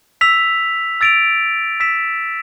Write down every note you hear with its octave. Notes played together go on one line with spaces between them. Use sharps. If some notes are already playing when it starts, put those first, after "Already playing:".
E6 B6 F7
E6 A6 D7 F7
E6 B6 E7